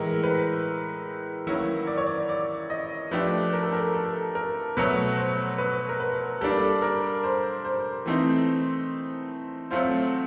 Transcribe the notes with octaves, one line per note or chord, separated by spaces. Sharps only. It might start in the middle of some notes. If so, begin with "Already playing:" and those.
Already playing: A2 E3 G#3 A#4
B4
D#3 F#3 A#3 C#4 E4
D5
C#5
D5
D5
D#5
F3 A3 D4 G4 B4
A#4
A4
A#4
A4
A#4
B2 F#3 A3 B4
C5
B4
A#4
B4
G3 A#3 D4 A4
A#4
C5
C5
E3 A3 C4 D#4
F#3 A3 C4 F4 C5